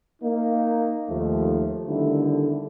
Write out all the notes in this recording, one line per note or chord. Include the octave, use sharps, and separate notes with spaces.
A#3 D#4
D#2 F3 A3
D3 D#3 G3 A3 B3 E4